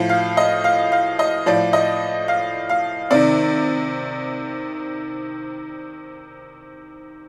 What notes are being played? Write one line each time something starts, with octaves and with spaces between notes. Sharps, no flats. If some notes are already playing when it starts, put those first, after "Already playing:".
Already playing: A2 F3
F5
D#5
F5
F5
D#5
A2 F3 D5
D#5
F5
F5
C3 D#3 D5